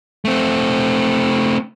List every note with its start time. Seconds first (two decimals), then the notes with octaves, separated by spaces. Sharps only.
0.25 A3 C4